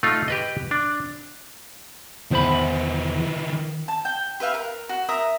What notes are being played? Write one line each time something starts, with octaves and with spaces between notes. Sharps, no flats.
A3 D#4 F4
G4 B4 D#5
D4
E2 D#3 E3 C5 B5
A5
G5
G4 B4 E5 F5
A#4
F#4
A#4 E5 A#5 D#6